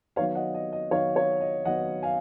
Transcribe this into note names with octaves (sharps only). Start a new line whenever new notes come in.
D#3 F#3 B3 D#4 C#5 F5
D#5 F#5
D#5
D#5
D#3 F#3 B3 D#4 C#5 F5
C#5
D#5
D#3 F#3 B3 D#4 D#5 F#5
F5 G#5